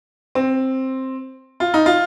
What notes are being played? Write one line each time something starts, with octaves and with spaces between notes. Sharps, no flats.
C4
F4
D#4
F4